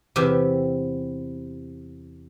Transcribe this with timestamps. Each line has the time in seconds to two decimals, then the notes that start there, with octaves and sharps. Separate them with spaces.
0.16 E2 C3 G4 E5 G5 G#5